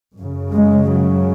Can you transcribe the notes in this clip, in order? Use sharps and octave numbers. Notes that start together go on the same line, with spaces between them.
F#2 C#3
G#3
F#3